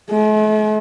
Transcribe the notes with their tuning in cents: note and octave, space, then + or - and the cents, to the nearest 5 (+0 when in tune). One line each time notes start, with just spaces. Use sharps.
A3 -45